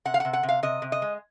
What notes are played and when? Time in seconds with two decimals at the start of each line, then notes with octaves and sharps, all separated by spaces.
0.05 C3 F#5
0.14 F5
0.20 F#5
0.25 C3
0.33 F#5
0.43 C3
0.49 F5
0.63 C3 D#5
0.82 C3
0.92 D#5
1.02 G#3